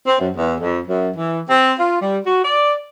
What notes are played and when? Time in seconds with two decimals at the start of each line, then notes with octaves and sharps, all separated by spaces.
0.07 C4
0.20 F#2
0.37 E2
0.60 F2
0.88 F#2
1.17 E3
1.48 C4
1.79 F4
2.02 G3
2.26 F#4
2.43 D5